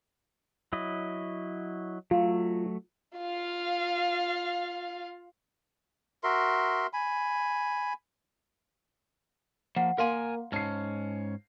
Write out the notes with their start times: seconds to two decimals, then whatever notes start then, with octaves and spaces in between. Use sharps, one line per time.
0.73 F#3 E4 D#5
2.11 F#3 A3 F4
3.18 F4 F5
6.24 F#4 A#4 E5 C6
6.93 G#5 B5
9.76 F3 A#3 F#5
9.98 A#3 A#4 F5 G#5 A#5 C6
10.52 G#2 C#4 A5 C7